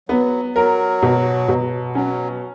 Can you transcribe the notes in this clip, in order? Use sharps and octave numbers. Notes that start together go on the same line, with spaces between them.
F#3 B3
F#3 A#4
B2
B2
F#3 C#4